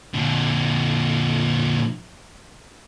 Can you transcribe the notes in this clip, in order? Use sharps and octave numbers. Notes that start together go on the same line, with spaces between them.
A#2 D3